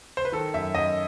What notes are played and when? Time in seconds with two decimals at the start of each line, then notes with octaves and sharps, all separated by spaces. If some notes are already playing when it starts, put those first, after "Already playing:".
0.17 C5
0.25 B4
0.32 D#3 A4
0.54 F#2 E5
0.75 F#2 D#5